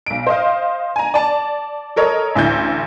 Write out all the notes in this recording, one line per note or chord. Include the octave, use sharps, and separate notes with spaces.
B1 D7
C5 D#5 F5
G#5 A#5
D5 A5
A4 A#4 C#5 D#5
A1 D2 E4 G6